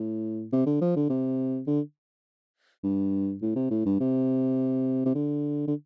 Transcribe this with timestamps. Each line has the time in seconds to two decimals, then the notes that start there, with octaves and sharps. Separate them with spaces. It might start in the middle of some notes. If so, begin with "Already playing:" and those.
Already playing: A2
0.52 C3
0.66 D3
0.81 F3
0.96 D3
1.10 C3
1.67 D3
2.83 G2
3.42 A2
3.55 C3
3.70 A2
3.86 G2
4.00 C3
5.05 C3
5.15 D3
5.67 D3